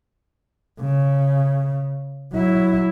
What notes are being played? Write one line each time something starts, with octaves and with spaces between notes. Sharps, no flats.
C#3
F#3 E4